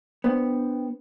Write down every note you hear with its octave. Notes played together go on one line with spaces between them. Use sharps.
B3 D4 C5 G5